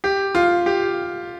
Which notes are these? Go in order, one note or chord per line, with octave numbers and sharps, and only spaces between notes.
G4
F4
G4